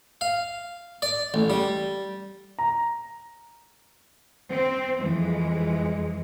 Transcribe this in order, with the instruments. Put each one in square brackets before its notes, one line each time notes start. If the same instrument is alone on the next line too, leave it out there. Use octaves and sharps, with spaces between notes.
[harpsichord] F5
D5
A1
G3
[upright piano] A#5
[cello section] C4
F2 E3 G#3